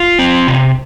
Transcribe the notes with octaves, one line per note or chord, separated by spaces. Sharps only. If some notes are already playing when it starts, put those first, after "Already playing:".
Already playing: F4
C4
C3